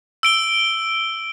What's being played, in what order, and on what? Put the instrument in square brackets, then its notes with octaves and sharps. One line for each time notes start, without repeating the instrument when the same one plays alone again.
[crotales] E6 D7 G7